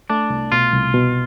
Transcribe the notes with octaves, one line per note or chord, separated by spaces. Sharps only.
A3 D4
C2
B2 F4
C2
B2